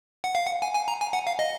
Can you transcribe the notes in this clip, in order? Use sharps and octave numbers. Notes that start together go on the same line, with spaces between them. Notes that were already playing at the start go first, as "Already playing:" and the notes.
F#5
F5
F#5
G#5
G#5
A#5
G#5
F#5
F5
D#5